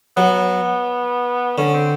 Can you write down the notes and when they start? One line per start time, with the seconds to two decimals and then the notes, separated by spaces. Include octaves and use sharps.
0.17 F#3 B3
1.58 D3 C#4
1.74 C4